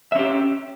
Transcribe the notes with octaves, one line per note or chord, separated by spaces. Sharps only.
C#4 G4 E5